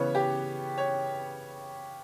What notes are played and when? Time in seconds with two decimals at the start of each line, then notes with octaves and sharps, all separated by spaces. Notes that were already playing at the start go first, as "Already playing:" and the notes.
Already playing: C#3 E3 B3 C#5
0.15 G4
0.78 C#5